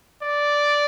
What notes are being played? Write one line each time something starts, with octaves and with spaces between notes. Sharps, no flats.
D5